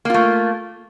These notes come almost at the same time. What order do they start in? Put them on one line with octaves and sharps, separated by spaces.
A#3 F4 A3